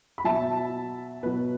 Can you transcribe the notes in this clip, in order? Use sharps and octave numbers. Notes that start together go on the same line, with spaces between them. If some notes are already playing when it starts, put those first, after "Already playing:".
B5
B2 F#3 E5 A5
B2 F#3 B4